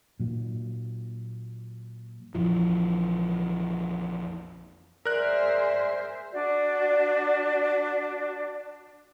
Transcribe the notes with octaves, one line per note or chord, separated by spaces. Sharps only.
A#2 F#3
A#1 F2 E3 F3
G#4 A#4 C5 D5 E5 F#6
D4 F#4 D5